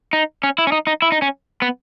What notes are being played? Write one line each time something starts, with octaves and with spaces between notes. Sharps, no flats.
D#4
C#4
E4
C#4
D#4
D#4
E4
D#4
C#4
B3